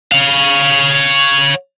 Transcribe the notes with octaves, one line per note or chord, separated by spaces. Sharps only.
C#5 F5